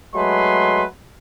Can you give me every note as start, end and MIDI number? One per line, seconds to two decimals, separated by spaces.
0.15 0.84 54
0.15 0.84 56
0.15 0.84 57
0.15 0.84 71
0.15 0.84 84